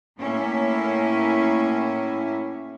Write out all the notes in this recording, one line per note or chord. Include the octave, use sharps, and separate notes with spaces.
A2 A#3 C#4 E4